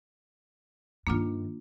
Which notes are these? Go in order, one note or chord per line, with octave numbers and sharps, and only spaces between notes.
G2 D#3 A#3 D4 F4